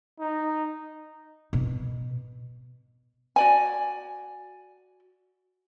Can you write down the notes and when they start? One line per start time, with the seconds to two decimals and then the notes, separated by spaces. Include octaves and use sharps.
0.20 D#4
1.53 B2
3.36 F#4 D5 G#5